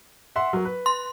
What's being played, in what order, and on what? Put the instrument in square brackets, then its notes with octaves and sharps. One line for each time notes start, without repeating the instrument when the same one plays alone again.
[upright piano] E5 F#5 C6
F#3 A#4
B4
[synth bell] C6